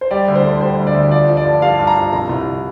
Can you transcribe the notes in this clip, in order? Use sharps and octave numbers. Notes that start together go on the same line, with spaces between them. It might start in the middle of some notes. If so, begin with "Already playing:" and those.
C5
G3 D5
D2
C5
D3
G3 C5
D2
D5
D2
F3 D5
F3
D5
G2
G2 F5
G2
A#5
F3
C2 A#5
C2